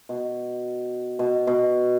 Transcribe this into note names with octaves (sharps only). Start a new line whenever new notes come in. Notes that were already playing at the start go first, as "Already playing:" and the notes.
B2
B2
B2